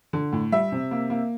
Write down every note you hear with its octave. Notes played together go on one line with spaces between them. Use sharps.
D3
A2
G3 E5
C3
A#3
A#3